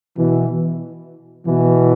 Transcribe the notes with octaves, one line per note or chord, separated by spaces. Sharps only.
B2 E3
B2 E3